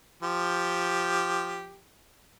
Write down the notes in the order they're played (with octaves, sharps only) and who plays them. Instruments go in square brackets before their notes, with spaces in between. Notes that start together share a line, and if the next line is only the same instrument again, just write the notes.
[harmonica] F3 G4